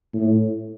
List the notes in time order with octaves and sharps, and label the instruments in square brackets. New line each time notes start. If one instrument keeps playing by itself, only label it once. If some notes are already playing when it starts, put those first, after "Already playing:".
[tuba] A2